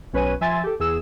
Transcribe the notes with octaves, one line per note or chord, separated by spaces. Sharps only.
B1 C#4 B4 C#5 G#5 D#7
F3 E5 G#5 C6 A6
G4 A4
E2 G#4 E6 E7